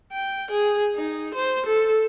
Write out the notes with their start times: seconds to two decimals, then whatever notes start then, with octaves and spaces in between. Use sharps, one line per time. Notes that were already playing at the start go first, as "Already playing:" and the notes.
0.12 G5
0.51 G#4
0.96 D#4
1.34 C5
1.66 A4